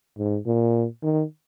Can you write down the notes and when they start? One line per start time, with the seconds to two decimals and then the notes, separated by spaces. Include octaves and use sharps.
0.18 G#2
0.46 A#2
1.03 D#3